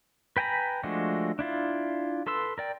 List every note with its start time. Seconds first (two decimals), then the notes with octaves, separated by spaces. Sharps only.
0.37 B4 G5 G#5 A#5 B5
0.83 F3 G#3 A3 D4 F#4
1.39 D4 E4 F4
2.27 A4 B4 C6 E6
2.58 A#4 D5 G5